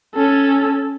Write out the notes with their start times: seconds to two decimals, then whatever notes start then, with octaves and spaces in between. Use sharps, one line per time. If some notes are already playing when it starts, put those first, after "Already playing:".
0.15 C#4 A4